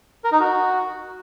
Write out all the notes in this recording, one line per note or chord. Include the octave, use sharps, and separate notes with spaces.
A#4
D#4
F#4